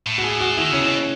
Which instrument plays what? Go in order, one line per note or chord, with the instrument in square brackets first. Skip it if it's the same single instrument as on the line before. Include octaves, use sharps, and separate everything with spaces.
[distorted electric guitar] A2
[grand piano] F#4
G#4
F#4
[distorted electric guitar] D#3 [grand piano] E4
[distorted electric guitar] C#3 [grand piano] C#4
[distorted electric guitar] B2